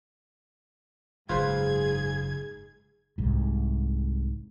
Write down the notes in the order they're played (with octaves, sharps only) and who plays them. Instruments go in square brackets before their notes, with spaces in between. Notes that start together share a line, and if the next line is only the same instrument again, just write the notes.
[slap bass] F#1 [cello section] G#2 G#4 [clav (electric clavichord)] F4 B4 C5 [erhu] G#6
[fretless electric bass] C2 G#2